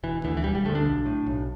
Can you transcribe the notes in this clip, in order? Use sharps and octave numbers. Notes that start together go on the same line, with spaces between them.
E1 E3
D2 D3 E3
E3
E1 G3
G3
D2 D3 A3
D4
B1
A2
B1